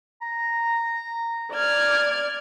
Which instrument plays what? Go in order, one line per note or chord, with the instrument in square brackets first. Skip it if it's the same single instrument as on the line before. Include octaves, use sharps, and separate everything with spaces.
[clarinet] A#5
[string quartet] D5 F6 G#6